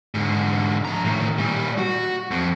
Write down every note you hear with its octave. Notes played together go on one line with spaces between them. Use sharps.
G#2 D3
F3 A#5
A2 D#3
A#2 G3
F#4
F2